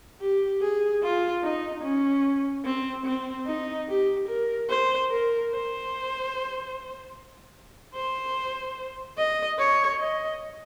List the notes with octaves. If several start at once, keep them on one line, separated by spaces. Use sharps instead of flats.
G4
G#4
F4
D#4
C#4
C4
C4
D#4
G4
A#4
C5
A#4
C5
C5
D#5
C#5
D#5